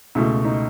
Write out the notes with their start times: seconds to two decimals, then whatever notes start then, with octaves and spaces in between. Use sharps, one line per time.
0.15 C#2 B2 A3 E4
0.45 D#4